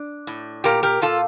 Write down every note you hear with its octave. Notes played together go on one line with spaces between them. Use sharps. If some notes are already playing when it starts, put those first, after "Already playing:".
Already playing: D4
A2
A#2 G4 A#4
G4 A#4
A#2 F4 A4